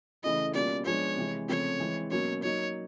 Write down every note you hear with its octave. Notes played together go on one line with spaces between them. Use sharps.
C#3 E3 A3 C#4 E4 D#5
B2 G3 A#3 C#4 F4 D5
F3 G#3 B3 D4 C#5
C3 E3 G#3
C#3 F3 A3 C4 C#5
E3 G#3 C4
B2 F#3 A#3 C#4 C#5
F#3 A#3 D#4 C#5